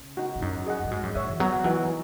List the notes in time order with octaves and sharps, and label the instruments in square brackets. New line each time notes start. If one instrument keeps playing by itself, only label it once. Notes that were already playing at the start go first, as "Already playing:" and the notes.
Already playing: [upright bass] C#3
[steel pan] D#4 F#4
[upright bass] G#2
[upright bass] F#2 [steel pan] D#4
[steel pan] G#4 D#5 F#5
[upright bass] A#2
[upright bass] G#2 [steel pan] F#4
[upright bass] F#2
[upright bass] F#2 [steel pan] C#5 E5
[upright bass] E3
[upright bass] F#3 [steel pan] B3
[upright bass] E3 [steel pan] D#4 F#4 B4